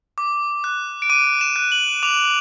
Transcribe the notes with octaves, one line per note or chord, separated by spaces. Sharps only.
D6
F#6
D7
D6 D#7
E7
F#6
F#7
D6 F7